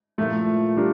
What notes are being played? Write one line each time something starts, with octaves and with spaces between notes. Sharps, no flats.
A#2 F3 A3 A#3 E4
G3 D4 F4 A#4